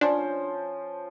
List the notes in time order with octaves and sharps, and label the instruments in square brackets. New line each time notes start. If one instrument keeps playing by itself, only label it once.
[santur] F3 C#4 C5 [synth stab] D4